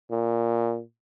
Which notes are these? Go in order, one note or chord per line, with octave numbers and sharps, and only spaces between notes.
A#2